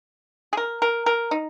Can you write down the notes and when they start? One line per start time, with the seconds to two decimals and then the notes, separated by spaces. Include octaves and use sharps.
0.53 G#4
0.57 A#4
0.82 A#4
1.06 A#4
1.31 D#4